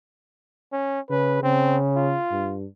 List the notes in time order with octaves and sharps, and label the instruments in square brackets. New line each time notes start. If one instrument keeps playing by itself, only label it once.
[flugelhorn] C#4
[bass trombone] C#3 [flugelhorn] B4
[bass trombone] C#3 [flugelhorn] C4
[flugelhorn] F4
[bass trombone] G2